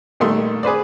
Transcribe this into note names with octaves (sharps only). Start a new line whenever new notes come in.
A#1 D#3 G3 A3 C6
G#4 B4 C5 D5